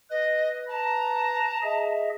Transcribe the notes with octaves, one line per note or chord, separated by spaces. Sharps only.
B4 D#5
A5 A#5
G#4 D#5 E5